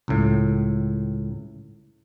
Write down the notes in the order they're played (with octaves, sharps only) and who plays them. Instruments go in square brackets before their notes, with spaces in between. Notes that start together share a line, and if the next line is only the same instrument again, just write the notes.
[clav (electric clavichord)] C#2 A2